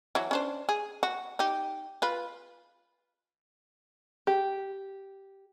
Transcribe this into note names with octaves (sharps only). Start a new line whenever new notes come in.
E3 F#3
C#4 D4 C5
G#4
F#4
D#4 G4
F4 B4
G4